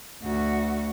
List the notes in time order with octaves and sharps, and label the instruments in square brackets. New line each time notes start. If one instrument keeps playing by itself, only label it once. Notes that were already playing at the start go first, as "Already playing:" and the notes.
[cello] D2 F#4